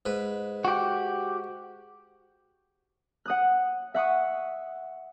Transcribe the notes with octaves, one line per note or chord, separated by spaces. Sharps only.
G#2 B4
F#4 G4
F#5 D#6 F#6
E5 F#5 C#6 D#6